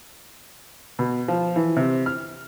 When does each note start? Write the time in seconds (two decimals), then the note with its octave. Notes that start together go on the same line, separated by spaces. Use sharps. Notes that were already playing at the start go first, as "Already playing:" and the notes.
0.99 B2
1.28 F3
1.56 E3
1.76 C3
2.06 F6